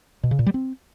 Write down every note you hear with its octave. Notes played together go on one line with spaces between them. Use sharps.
B2
C#3
A#2
G3
C4